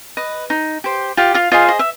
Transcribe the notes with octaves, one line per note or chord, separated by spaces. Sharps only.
B4 D#5
D#4
G4 C5
F4 G4 G5
F4 F5
F4 G#4 C5 D#5 F5
D#5
E5